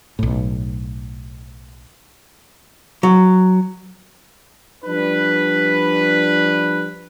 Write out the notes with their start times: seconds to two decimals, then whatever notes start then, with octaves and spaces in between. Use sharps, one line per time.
0.19 B1 A2
3.03 F#3
4.84 F3 G3 D4 B4